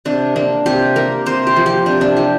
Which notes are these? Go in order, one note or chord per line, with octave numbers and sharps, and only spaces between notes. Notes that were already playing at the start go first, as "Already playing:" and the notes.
C3 D4
A#3 D4
C3 G4
A#3 A#4
C3 C5
G4
F3 A#3
G4
C3 D4
D4
F3 A#3 G4